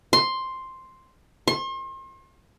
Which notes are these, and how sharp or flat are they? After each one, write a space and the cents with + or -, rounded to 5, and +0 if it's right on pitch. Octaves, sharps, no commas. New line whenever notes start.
C6 +5
C6 +40